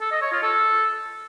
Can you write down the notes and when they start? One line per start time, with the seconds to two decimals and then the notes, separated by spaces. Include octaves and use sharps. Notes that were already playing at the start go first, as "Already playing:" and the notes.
0.01 A4
0.11 D#5
0.22 C#5
0.32 F4
0.43 A4